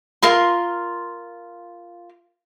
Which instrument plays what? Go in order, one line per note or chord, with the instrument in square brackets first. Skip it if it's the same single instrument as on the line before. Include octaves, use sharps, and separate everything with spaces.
[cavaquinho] F4 A#4 C6